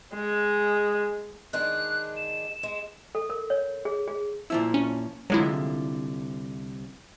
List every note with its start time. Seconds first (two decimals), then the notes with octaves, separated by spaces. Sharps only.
0.14 G#3
1.53 D#3 G#3 D4 F#6
2.17 E7
2.63 G#3
3.15 A4
3.30 A#4
3.50 C#5
3.85 G#4
4.07 G#4
4.50 A#2 F3 E4 E6
4.74 C#4
5.30 C2 D3 F#3 G#3 E4 F4